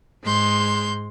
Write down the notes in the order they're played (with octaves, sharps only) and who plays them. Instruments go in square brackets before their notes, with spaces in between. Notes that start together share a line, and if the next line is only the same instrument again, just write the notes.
[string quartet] G#2 G#3 C6 G6